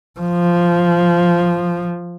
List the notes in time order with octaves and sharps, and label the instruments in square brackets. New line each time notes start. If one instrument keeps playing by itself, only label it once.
[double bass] F3